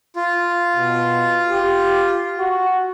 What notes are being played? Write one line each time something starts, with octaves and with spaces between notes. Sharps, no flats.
F4
B2
G4
F#4